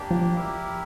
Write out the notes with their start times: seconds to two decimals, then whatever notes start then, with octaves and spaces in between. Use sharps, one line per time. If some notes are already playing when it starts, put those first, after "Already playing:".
Already playing: A#3 D4 G4
0.11 F3
0.36 E4 G4 A#4